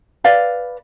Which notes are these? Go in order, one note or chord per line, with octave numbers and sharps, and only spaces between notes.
B4 D5 F5